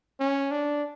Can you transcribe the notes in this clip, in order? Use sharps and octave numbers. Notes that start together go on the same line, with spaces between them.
C#4
D4